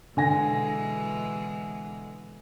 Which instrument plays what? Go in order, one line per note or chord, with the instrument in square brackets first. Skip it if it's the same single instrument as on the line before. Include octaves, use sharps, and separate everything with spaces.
[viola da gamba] B2 E3 G#3 [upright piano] D3 G#5 A#6